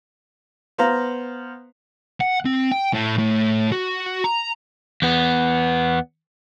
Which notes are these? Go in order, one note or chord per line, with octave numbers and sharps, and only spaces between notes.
B3 C5 F5 A#5
F#5
C4
G5
A2
A2
F#4
A#5
E2 B3